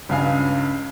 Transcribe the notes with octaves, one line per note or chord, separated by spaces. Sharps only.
C#2 G2 C#3 F5 G#5